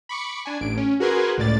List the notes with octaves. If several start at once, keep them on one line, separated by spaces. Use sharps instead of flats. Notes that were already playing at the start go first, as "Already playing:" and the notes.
B5 C#6 D6 C#7
D4 G#5
A1 D7
C#4
F#4 G#4 A#4 B4 G#5 C6
C#2 A2 D5 A6